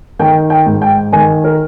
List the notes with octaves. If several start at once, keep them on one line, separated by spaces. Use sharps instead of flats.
D#3 G5
G5
G#2
G5
D#3 G#5
A#4